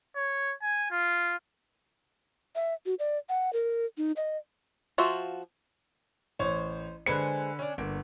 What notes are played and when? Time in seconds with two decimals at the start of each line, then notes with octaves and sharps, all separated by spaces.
0.16 C#5
0.62 G#5
0.91 F4
2.56 E5
2.86 F#4
2.99 D5
3.29 F#5
3.53 A#4
3.98 D#4
4.16 D#5
4.98 F3 F4 F#4 E5
6.39 A1 C5 C#5
7.06 D3 G#3 B4 C5 G#5 C#7
7.59 C#4 D4
7.78 G1 A#3